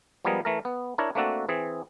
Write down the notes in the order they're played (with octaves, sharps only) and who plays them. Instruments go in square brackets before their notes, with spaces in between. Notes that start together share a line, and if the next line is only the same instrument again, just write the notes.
[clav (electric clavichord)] F3 G3 G#3 B3 G#4 A#4
E3 A3 A#4
B3
D4 E4 A#4 C#5
A3 A#3 C4 D4 F#4 A4
E3 C4 G#4